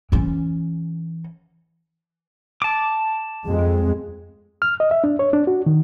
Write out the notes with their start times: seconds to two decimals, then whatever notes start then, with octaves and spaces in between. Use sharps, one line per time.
0.12 E3 C#4
2.62 A5 D6
3.46 F2 G#3
4.62 F6
4.80 D#5
4.91 E5
5.04 D4
5.19 C#5
5.33 D4
5.47 F#4
5.66 D#3